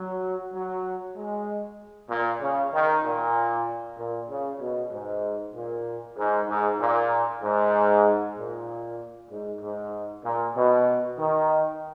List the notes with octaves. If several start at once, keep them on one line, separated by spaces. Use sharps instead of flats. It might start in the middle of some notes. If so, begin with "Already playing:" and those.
Already playing: F#3
F#3
G#3
A#2
C#3
D#3
A#2
A#2
C#3
B2
G#2
A#2
G#2
G#2
A#2
G#2
A#2
G#2
G#2
A#2
B2
D#3